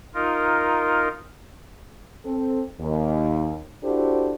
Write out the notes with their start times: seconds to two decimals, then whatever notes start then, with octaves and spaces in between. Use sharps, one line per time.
0.14 D#4 F4 A#4
2.25 C4 A4
2.79 D#2
3.83 D4 E4 F#4 G4 A4 C5